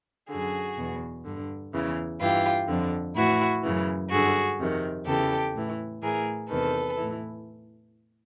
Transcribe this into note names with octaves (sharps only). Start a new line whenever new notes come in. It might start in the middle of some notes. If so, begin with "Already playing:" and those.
F#2 D3 F#4 G#4
E2 B2
G2 D3
E2 C#3 E3
G2 E3 F4 G4
F2 D3
A2 E3 E4 F#4
F#2 C#3 E3
G2 D3 F#4 G#4
F2 C3 D#3
E2 C#3 E3 G4 A4
A2 E3
A2 E3 G#4 A#4
E2 C3 D#3 A4 B4
A2 E3